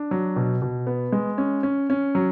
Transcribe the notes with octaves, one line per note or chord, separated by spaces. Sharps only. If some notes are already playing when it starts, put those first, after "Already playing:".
Already playing: D4
F#3
B2
B2
B3
G#3
C#4
C#4
C#4
F#3